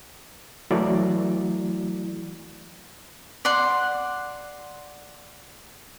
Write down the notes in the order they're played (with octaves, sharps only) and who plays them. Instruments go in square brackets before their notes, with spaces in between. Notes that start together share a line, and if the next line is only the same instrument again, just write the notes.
[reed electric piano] E3 F#3 A3 E4 F#4 D5
[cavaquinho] D5 F#5 C6